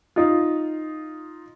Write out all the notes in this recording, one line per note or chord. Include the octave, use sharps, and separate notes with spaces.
D#4 F4